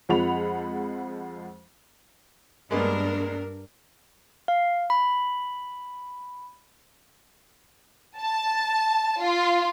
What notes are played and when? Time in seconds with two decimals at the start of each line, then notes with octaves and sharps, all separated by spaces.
0.09 F2 F3 G#3 F#5 B5 F7
2.71 G2 G#3 A#3 B3 D4 A#4
4.48 F5
4.90 B5
8.19 A5
9.21 F4